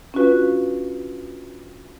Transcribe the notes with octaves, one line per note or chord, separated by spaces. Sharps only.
C#4 D4 F4 F#4 B4 F5